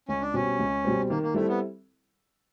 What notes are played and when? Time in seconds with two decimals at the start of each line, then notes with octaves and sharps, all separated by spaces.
0.09 C#2 C#4
0.22 D4
0.34 B2 G3 C4 C#4
0.59 C#2
0.84 B2 G3 C4
1.09 D#3 A#3
1.23 A#3
1.34 G3 A3 C4 E4 A4
1.48 B3